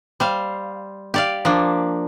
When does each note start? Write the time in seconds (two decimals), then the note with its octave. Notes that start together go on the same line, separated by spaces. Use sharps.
0.20 G3 C5 F5
1.14 G4 D5 F5
1.45 F3 A#3 D4